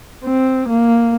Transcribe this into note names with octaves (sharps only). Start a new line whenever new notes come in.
C4
A#3